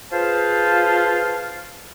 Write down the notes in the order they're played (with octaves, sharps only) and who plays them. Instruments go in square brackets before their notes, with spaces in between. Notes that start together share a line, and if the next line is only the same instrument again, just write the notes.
[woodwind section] F4 G#4 B4 C5 F5 A5